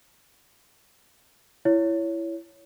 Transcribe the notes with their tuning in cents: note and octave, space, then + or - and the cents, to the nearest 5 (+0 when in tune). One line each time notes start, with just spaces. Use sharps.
E4 +15 C#5 +15